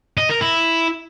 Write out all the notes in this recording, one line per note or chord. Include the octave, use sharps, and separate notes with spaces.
D#5
A#4
E4